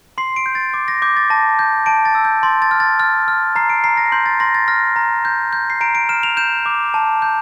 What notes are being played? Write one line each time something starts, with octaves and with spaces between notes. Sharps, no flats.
C6 C7
D7
G6
A6
D6
A#6
D6 G6
A6
A5 A#6
G6
A5 D7
A6
E6
G6
C6 A6
A6
F6
A6
F6 A6
F6
A#5 C7
D7
A#5 C7
A#6
C6 G6
A6
C6 A#6
A6
F6 A#6
A#5
G6
G6
C7
A#5 D7
D7
F6 E7
F7
G6 E7
D6
A5
G6